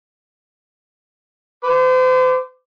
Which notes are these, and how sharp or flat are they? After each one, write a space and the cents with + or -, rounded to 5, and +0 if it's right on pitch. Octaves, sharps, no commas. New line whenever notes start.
C5 -40 D6 +0